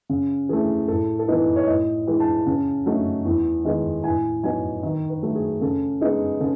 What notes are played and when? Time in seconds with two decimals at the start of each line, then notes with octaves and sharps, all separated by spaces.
0.09 C#3
0.49 E3 A3 G#4
0.88 A2 A4
1.19 A4
1.28 E3 B3 D#4 B4
1.56 C#5
1.67 A2 D#5
2.07 E3 G#3
2.20 A5
2.46 C#3
2.86 F#3 A3 D#4
3.25 E2
3.65 D#3 G#3 B3 D#4
4.04 A2 G#5
4.43 F#3 B3 D#4 G#5
4.83 D#3
5.10 B4
5.22 F#3 A3
5.35 G#4
5.61 C#3 A4
6.01 G#3 B3 D#4 G#4
6.40 C#3 A4